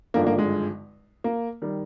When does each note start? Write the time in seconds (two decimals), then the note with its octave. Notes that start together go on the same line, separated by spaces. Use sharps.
0.14 G#1 G2 D3 F3 A#3
0.27 A#3
0.39 G#3
1.24 A#3
1.62 D#3 G3